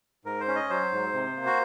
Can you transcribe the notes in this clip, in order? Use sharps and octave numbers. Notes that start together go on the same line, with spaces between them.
G#2 A#4
C5
C#4
D#5
F#3 C5
G#2
C3
A#3
F#4